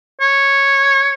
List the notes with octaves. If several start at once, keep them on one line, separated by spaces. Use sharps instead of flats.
C#5